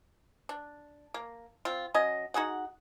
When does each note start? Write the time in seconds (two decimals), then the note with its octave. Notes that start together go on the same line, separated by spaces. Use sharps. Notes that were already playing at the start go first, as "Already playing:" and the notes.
0.49 D4
1.14 A#3
1.65 C4 F4
1.94 F#3 C#4 D#5
2.34 D#4 F#4 G#4 F#5